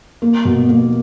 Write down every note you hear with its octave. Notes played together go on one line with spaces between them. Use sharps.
A#3
B2
A#3